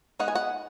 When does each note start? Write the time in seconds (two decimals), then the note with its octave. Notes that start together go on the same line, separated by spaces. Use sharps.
0.19 G#3 B3 D#4 F#5
0.28 G#5
0.35 F#5